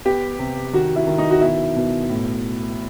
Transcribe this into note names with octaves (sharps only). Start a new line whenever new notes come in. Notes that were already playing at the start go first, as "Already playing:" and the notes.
B3 G4
C3
D#3 F#4
E4
D#3
D#4
F#4
B2 E4
B2
A2